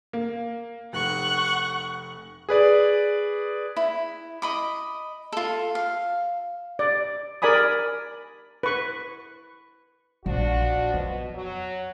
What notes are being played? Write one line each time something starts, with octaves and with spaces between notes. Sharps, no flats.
A#3
F1 F#5 C#6 F#6
G#4 B4 D5
E4
D#5 B5 D6
F4 A4
F5
D5
A#4 D5 G#5 B5 D#6
B4 C#6
A#1 F3 D4 F#4
F2 B2
F#3